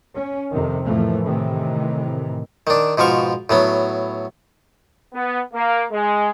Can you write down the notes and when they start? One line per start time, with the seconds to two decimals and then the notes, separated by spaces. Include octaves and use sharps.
0.15 C#4
0.52 F2 C3 D#3
0.85 F2 A2 E3 F3 A3 A#3
1.24 A2 C3 D#3 E3
2.67 D#3 D4
2.98 G#2 B2 F3 F5 C#6
3.49 A2 F#3 B3
5.14 B3
5.54 A#3
5.91 G#3